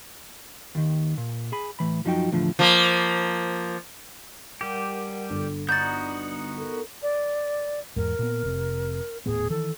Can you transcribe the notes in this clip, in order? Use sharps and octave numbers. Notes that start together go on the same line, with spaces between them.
D#2 D#3
A#2
G#4 G#5 B5
A2 E3 B5
F#2 F3 F#3 D#4 F#4 G5
E2 A2 D3 F3
F3 A#3
G3 G4 A#4 F#5 A5
G1 D4 A4
B3 D#4 F#4 D5 A#5 D6 G6 A6
A4 A#4
D5
E2 G#2 A#4
A#2 B3
F1 C3
D#1 A2 B3 G#4
D#3 E3 A4